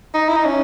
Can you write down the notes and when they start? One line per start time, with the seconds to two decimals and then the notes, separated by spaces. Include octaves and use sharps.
0.14 D#4
0.29 E4
0.37 D#4
0.45 C#4